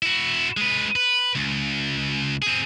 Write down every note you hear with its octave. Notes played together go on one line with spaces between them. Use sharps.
E4 F#4
G#3 B4
B4
C#2
C4 G#4